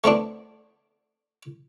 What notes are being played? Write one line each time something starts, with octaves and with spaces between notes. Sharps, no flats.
A3 B3 C4 D4